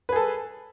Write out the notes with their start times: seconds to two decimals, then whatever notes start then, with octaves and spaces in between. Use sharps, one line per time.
0.09 B4
0.12 G#4
0.16 A4